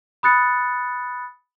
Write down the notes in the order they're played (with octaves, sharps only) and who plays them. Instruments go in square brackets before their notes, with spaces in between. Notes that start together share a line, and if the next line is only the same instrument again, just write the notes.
[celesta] B5 D#6 F#6 A6 C#7